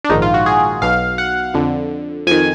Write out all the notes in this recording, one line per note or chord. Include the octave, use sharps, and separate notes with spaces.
D4
A#1 G#2 D#3 D#4
F4
F#4
G#4
B1 B2 F5
F#5
F2 D3
F2 D#3 G#5